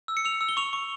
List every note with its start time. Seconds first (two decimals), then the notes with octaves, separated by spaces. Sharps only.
0.08 E6
0.17 C#7
0.25 E6 F7
0.41 E6
0.49 G7
0.57 C#6 F7
0.73 C#6